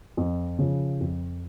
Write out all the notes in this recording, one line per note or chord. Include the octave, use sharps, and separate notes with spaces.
F2
C#3 F3
F2